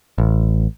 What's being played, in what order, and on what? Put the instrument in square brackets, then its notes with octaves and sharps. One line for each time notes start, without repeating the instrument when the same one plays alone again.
[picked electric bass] A1